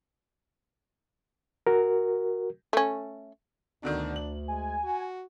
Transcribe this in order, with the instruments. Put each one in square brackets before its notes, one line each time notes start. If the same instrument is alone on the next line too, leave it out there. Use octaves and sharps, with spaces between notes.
[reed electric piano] F#4 A#4
[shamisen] A3 C#4
[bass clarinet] D2 [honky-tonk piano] B2 D3 D#3 [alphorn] D4
[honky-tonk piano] F#7
[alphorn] G#3 [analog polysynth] G#5
[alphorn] F#4